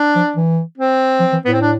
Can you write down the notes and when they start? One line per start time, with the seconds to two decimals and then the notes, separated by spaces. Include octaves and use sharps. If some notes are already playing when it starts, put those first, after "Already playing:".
Already playing: D4
0.15 F3
0.36 E3
0.77 C4
1.20 F3
1.33 E3
1.45 A2 B3
1.53 C4
1.61 D4